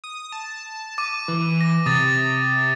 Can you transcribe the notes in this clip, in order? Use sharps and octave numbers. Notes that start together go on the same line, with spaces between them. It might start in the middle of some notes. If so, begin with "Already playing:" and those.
D#6
A5
D6 D#7
E3
A#6
C3 D#6 A6